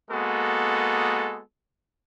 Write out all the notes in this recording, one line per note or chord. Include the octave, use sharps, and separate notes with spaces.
G#3 A#3 B3 F#4 A4